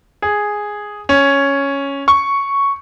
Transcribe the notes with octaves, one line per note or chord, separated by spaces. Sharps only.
G#4
C#4
C#6